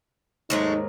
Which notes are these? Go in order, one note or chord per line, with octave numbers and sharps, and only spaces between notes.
D#2 G#2 F#3 G#3 A3 D#4 A#4